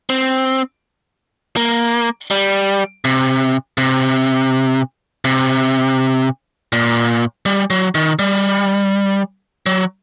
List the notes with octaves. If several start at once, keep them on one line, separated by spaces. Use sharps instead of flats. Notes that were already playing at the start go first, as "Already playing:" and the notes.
C4
A#3
G3
C3
C3
C3
A#2
G3
F#3
D#3
G3
F#3